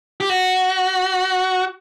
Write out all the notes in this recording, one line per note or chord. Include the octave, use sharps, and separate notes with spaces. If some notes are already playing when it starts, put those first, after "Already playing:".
G4
F#4